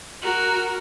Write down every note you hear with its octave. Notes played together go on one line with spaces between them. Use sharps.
F#4 A#4